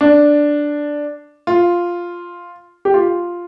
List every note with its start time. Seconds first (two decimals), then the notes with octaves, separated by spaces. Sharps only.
0.01 D4
1.47 F4
2.85 G4
2.94 F4